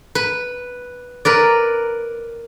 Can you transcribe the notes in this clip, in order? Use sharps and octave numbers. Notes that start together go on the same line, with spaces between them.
B4
A#4 B4 D5